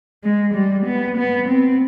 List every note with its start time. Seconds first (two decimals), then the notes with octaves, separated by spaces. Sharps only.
0.24 G#3
0.54 G3
0.86 B3
1.17 B3
1.49 C4